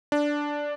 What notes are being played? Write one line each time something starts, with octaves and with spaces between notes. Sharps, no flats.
D4